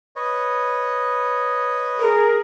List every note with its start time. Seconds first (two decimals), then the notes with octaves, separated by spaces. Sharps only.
0.16 B4 C#5 D#5
1.99 G#4 A#4